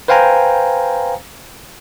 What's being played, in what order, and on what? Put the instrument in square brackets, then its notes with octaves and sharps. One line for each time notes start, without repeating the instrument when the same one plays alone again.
[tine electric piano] B4 C5 F5 G5 G#5 A#5